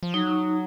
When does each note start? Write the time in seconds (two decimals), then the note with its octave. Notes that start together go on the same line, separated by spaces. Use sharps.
0.03 F3
0.14 F#3 D#4